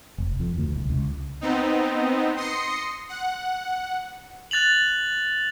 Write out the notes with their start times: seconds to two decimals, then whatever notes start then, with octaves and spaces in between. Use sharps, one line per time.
0.18 F1
0.40 F2
0.58 D2
0.76 C2
0.90 C#2
1.41 B3 C4 D#4
2.36 C6 D#6 A#6 C7 C#7
3.09 F#5
4.51 F#6 A6 F7 F#7